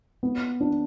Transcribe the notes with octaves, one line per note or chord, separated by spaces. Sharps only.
B3
D4